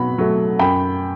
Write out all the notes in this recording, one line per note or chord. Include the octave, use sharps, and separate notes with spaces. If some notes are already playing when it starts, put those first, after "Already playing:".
Already playing: B2 F#3 B5
F#3 A3
F#2 G5 B5